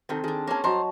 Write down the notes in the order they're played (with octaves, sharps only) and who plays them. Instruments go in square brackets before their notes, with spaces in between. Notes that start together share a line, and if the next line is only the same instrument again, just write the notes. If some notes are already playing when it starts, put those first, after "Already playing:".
[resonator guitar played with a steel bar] C3 D#3 [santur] C4 A4
[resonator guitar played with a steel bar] D#3 D4 [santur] G#4
[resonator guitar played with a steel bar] A#3 C#4 [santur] C#5 A5
[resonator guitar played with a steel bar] G2 C5 A#5 [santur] F#3 D#5 A5